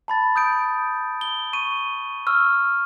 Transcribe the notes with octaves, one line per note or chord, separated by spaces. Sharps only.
A5 B5 A6
D#6 G6 D7
G7
C#6 D#7
C#6 E6 F6